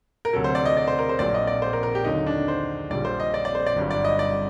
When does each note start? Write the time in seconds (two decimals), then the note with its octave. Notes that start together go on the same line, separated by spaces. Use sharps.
0.25 A#4
0.33 D2 C3 F#3 A4
0.44 C5
0.55 D5
0.65 D#5
0.77 D5
0.88 C5
0.99 A#4
1.09 C5
1.19 A#1 A#2 F#3 D5
1.34 D#5
1.47 D5
1.62 C5
1.73 A#4
1.83 A#4
1.95 G4
2.05 D#2 D3 F#3 D#4
2.26 D4
2.48 C5
2.90 A#1 A#2 G3 D5
3.05 C5
3.20 D#5
3.34 D5
3.45 D5
3.55 C5
3.66 D5
3.76 G1 G2 F#3
3.91 D5
4.05 D#5
4.19 D5